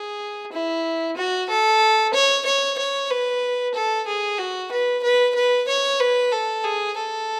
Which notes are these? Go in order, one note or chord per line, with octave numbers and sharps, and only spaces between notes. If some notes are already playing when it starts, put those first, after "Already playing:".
Already playing: G#4
E4
F#4
A4
C#5
C#5
C#5
B4
A4
G#4
F#4
B4
B4
B4
C#5
B4
A4
G#4
A4